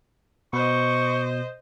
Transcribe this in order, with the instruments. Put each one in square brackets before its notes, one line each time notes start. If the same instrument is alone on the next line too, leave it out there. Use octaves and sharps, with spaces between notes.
[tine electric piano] B2 [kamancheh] C5 D#5 [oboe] C#6